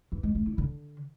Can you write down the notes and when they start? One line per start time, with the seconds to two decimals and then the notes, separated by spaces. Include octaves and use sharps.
0.12 E3
0.23 G#3
0.35 A3
0.46 E4
0.58 D3